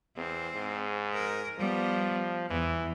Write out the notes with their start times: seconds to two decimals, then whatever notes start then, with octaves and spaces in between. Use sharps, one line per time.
0.17 E2 C4
0.55 G#2
1.14 A#4
1.59 F3 G3 B3
2.50 E2 E3